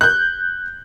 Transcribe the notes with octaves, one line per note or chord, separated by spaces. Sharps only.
F#6 G6